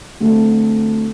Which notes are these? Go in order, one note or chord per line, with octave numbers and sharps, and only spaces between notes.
D2 D3 A3 C4